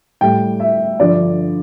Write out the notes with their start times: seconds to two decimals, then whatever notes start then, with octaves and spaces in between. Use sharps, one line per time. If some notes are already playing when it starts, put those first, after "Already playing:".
0.21 A2 G3 G5
0.60 E5
0.99 G2 D3 F3 D5